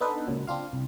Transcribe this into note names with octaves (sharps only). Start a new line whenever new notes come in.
B3 D4 D#4 A4 B4 C5
C#2 A#2 F#3
C4 D4 F4 F5
C2